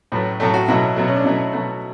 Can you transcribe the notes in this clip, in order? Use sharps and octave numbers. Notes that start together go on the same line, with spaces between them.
A2 F#3 A3 B4
A2 F#3 A3 A4
F#4
B2 F#3 A3 E4
B2 F#3 A3
C#4
D4
B2 F#3 A3 E4
B2 F#3 A3